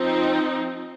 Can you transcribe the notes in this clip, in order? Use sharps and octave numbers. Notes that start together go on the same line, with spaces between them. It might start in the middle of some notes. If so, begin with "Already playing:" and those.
Already playing: F3 C4 D#4